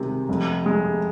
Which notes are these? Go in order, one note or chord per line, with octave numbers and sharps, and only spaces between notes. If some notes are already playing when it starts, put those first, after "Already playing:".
Already playing: C3 D#3 G#3
F1
G#3